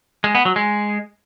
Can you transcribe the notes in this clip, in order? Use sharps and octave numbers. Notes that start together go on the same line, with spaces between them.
G#3
B3
F#3
G#3